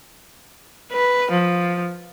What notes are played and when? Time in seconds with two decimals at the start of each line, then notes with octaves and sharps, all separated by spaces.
0.92 B4
1.31 F3